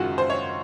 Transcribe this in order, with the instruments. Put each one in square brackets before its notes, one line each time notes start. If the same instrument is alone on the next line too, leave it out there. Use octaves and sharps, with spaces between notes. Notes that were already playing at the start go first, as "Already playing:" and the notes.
Already playing: [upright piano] F#1 F#2 D#3 G#3 F4 F#4
C5
C#5